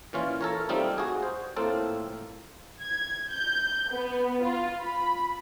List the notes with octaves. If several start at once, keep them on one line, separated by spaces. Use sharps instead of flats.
A#2 E3 C#4 F4
A4 A#4 C#5
G3 A3 C4 D#4 F4
F#4 G#4
C5
A2 A#3 C4 F4 A4
G#6
G6
B3
F4
B5